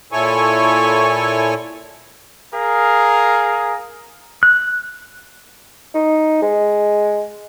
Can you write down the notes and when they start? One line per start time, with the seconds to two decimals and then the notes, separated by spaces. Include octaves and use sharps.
0.12 A#2 E4 A4 C#5 G#5 C#6
2.54 G#4 A#4 F5 A#5
4.43 F#6
5.94 D#4
6.42 G#3